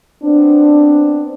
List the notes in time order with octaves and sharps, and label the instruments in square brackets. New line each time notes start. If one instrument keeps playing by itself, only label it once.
[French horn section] B3 C4 D4